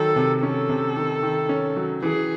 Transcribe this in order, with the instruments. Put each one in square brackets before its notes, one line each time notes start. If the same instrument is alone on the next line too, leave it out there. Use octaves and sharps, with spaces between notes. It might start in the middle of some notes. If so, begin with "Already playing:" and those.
Already playing: [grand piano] D#3 F#3 [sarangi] A4
[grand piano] C3
[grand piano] C#4 [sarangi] A4
[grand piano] C3
D#3
D#3
C#4
F#3
[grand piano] E3 [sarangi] G#4